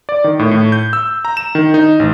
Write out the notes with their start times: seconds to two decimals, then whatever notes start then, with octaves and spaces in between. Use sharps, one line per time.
0.09 D5
0.24 D#3
0.39 A2
0.51 A2
0.72 G6
0.93 E6
1.25 A#5
1.37 E7
1.55 D#3
1.74 D#4
2.00 A1